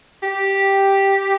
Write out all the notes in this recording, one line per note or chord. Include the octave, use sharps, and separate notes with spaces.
G4